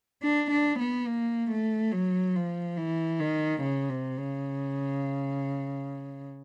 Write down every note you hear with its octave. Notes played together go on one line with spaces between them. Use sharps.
D4
D4
B3
A#3
A3
F#3
F3
E3
D#3
C#3
C3
C#3